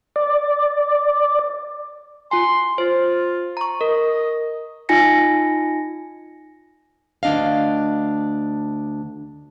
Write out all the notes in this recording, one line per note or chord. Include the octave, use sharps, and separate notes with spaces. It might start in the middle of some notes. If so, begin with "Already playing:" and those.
D5
F4 G#5 C6
F4 C5
A#5 C#6
A#4 D#5
D#4 F4 G#5 A#6 C#7
D2 F#3 D4 D#5 F5